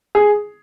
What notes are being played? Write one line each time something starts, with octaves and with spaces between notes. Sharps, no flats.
G#4